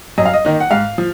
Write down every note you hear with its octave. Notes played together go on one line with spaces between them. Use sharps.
F#2 D#5
F5
D#5
D#3 A#3 D#4
F#5
G#2 F5
F3